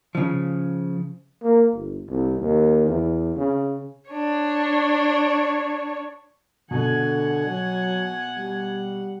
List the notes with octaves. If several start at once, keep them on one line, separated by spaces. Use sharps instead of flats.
C#3 F3
A#3
G1
C2
D#2
E2
C#3
D4 C#5
B2 D3 F#5 G#5
F#3
G3